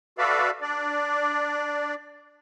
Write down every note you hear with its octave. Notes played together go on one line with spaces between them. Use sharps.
F#4 A4 B4 D5 E5 F5
D4 D5